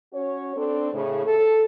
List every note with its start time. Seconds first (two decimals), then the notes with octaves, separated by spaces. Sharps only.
0.13 C#4 F#4 C#5
0.56 C4 D4 A4
0.93 A2 C#3
1.26 A4